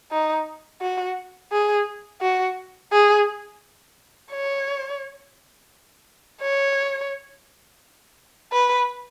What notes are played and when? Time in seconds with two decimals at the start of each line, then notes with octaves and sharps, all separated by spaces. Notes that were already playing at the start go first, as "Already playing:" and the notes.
0.11 D#4
0.81 F#4
1.52 G#4
2.21 F#4
2.92 G#4
4.31 C#5
6.42 C#5
8.52 B4